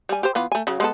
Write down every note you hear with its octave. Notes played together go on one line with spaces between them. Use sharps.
G3 G#5
G4 C5
E3 B3 F4
A3 G#5
C#3 F#3
G#3 B3 A4